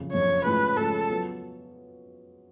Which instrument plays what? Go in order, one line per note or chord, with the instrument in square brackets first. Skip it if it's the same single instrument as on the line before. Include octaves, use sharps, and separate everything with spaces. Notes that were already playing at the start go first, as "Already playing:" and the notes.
Already playing: [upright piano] F#1 F2 C#3
[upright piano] F#1 F2 C#3 [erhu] C#5
[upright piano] A2 F3 G#3 C#4 G#4 [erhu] B4
[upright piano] A2 F3 G#3 C#4 G#4 [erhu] A4
[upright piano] F#3 B3 F4